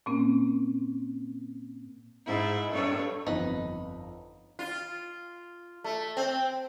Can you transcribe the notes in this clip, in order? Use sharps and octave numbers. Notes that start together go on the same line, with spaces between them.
A#2 A#3 C4 C#4
G#2 E4
G2 A4 C#5
G1 F2 D#4 B4
F4
A3
C4